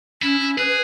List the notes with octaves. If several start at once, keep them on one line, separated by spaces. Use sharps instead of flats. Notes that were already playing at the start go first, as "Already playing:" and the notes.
C#4 E4
C#4
G#4 B4
B4